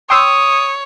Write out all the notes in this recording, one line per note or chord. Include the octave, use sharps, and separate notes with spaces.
C#5 G5 C6 D#6 E6